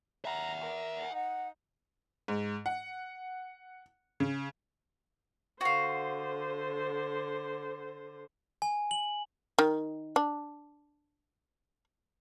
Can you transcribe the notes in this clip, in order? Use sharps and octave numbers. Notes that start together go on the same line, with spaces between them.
E5 F#5 A#5
A#4
D#4 F#5
G#2
F#5
C#3
D3 F#4 C5 F5
G#5
F#7
D#3
D4